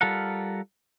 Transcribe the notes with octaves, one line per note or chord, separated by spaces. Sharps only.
G3 F4 A4 A#4 F#5